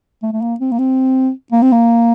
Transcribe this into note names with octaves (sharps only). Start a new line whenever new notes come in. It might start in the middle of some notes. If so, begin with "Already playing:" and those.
A3
A3
A#3
C4
A#3
C4
A#3
C4
A#3